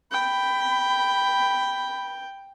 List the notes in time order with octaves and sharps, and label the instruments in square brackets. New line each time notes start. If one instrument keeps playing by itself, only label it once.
[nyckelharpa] G5 [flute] B5